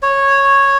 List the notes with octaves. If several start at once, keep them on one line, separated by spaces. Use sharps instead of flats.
C#5